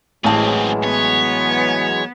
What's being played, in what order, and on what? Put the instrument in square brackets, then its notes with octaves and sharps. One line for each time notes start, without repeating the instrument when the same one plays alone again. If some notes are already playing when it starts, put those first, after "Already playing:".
[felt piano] A1 A5 [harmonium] E3 F#3 G#3 [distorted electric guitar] C4 G#4
[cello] B3 [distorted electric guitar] C#5